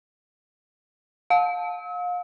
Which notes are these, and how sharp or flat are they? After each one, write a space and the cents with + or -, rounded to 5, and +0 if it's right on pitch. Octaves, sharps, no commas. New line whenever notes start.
F5 +35 E6 -40